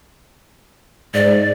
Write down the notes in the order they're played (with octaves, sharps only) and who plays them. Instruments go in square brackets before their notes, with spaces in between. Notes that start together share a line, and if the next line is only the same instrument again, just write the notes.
[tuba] G#2 [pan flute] D5